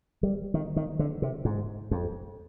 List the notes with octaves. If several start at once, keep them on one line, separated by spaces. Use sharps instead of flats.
G3
D#3
D#3
D3
C3
G#2
F2